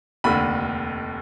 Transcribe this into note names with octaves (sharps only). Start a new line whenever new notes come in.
F1 D#2 D3 B5